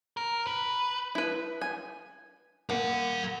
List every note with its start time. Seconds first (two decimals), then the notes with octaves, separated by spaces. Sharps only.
0.17 A#4
0.47 B4
1.15 E4 B4
1.61 G#5
2.70 A#3 A#4 F#5